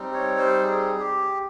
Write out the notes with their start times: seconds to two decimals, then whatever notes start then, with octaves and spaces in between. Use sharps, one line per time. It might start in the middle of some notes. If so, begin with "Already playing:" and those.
Already playing: G3 C4 D#4
0.14 C#5
0.38 C5
0.63 G#4
1.00 G4